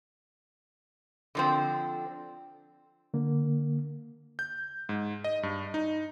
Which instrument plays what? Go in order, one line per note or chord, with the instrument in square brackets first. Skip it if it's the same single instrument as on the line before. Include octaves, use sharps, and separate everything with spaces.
[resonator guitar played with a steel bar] D3 F3 C4
[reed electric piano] D3 A#3
[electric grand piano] G6
G#2
D#5
G2
D#4